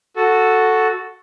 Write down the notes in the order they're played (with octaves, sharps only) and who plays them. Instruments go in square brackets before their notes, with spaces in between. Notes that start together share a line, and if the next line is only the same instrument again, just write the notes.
[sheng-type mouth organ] F#4 A4